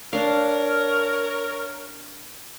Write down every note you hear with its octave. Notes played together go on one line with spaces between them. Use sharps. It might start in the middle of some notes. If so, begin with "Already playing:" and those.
D4 A#4 C#5 F5